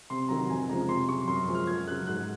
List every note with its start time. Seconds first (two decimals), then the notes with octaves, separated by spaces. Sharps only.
0.10 C3 C6
0.29 D#3 F#3 A#5
0.50 F2 G#5
0.69 C#3 F3 G#3 A#5
0.88 C3 C6
1.08 F#3 C#6
1.28 F#2 C6
1.48 F3 G#3
1.55 F6
1.67 F#2 G#6
1.87 C#3 F#3 F#6
2.07 G#2 F#6